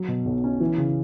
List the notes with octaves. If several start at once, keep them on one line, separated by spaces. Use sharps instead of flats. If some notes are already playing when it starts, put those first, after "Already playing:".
Already playing: F#3
B2
B1
C#4
E3
C#3